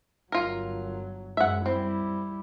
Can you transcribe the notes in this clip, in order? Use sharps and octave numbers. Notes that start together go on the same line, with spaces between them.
G1 F#3 F4 A#4
F#2 G#3 E5 F#5
G3 C4 E4